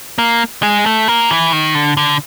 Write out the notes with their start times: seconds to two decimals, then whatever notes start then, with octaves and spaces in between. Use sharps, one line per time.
0.18 A#3
0.63 G#3
0.86 A3
1.08 A#3
1.31 E3
1.53 D#3
1.75 D3
1.97 D3